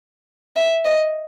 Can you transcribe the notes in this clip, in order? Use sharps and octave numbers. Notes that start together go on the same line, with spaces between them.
E5
D#5